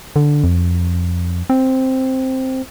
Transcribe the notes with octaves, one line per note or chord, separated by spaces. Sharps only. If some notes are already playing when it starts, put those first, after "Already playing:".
D3
F2
C4